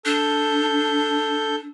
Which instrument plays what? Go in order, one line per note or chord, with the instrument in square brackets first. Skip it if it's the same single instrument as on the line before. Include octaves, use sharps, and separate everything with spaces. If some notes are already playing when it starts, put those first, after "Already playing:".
[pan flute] D4 [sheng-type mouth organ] A4 G6